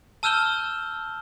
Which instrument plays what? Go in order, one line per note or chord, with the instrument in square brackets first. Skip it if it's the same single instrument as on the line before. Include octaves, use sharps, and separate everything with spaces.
[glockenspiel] A5 E6 F6 G6 E7 G7